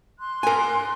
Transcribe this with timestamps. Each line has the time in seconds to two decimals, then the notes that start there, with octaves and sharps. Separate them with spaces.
0.20 C6 F#6
0.43 A#4 G#5